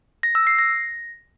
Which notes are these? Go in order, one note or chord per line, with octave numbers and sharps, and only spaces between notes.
A#6
E6
C7
A#6